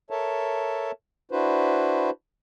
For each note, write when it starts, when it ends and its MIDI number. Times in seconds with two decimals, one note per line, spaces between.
0.10 0.91 69
0.10 0.91 70
0.10 0.91 73
0.10 0.91 76
0.10 0.91 81
1.31 2.10 62
1.31 2.10 64
1.31 2.10 66
1.31 2.10 71
1.31 2.10 72